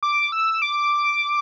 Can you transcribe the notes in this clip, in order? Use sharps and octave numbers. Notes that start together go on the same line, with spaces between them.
D6
E6
D6